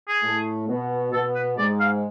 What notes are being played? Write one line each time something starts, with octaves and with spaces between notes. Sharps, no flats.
G#4
A2 A3
B2 B3
B2 B3 A4
B4
G#2 G#3 D5
F5